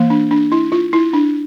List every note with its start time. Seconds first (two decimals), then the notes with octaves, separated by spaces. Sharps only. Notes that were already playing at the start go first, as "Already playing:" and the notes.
Already playing: E3 A#3
0.10 D4
0.31 D4
0.52 E4
0.72 F4
0.93 E4
1.13 D4